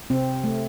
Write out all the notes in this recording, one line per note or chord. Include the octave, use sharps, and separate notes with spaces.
C3 C4
A3